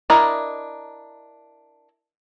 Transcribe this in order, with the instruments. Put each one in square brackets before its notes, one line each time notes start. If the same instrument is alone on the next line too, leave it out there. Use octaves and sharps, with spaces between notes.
[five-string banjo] D4 E4 A#4 D#5